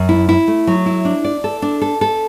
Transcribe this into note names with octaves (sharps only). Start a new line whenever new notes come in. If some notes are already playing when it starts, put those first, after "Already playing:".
Already playing: F#2
E4
E4
A3
F#3
E4
D4
D5
A4
D4
A4
A4